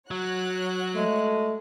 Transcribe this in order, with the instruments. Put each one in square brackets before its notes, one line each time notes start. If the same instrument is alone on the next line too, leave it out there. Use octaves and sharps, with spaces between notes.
[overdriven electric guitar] F#3 [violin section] F#4 C#5 F#6
[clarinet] G#3 [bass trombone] A3